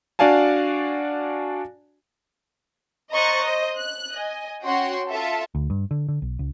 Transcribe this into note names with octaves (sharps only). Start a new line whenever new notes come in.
D4 F#4 D5 F5 G#5 A5
C5 D#5 A#5 C#6 F#6 A6
C5 D#5
F#6
D#5 G#5
C#4 F#4 C#5 F#5 G5 C6
F4 A4 E5 A5
D2
G2
D3
D3
B1
C#2